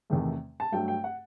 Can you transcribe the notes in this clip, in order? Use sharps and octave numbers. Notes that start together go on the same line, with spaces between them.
E2 C3 D#3 A3
A5
G2 F#3 A3 G5
G5
F#5